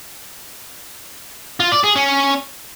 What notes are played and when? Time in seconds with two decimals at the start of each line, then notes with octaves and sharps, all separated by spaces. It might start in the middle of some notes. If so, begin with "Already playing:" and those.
1.60 F4
1.72 D5
1.84 G#4
1.96 C#4